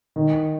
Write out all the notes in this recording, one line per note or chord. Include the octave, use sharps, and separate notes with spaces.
D#3